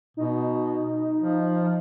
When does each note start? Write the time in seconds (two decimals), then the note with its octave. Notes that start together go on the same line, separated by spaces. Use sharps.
0.17 B2 D#4
1.19 F3